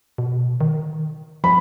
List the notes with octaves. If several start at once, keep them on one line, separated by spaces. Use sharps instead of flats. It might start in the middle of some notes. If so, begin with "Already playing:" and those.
B2
D#3
F3 B5